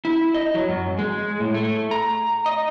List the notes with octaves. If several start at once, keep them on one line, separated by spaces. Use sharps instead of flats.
E4
D#5
F#3
F#2
G#3
A2
A3
A#5
D#5